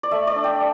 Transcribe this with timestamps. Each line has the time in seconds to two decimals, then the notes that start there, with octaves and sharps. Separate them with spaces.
0.03 D5
0.11 A3 E5
0.27 D5
0.36 D4
0.44 G5